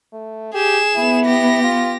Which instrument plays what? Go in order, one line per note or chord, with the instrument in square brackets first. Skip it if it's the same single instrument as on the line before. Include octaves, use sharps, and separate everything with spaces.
[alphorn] A3
[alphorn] G4 [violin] G#4 E7
[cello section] B3 [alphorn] E4
[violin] G4 A#6
[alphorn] F4